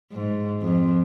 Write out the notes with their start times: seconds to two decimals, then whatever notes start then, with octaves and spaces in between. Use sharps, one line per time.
0.12 G#2
0.62 F2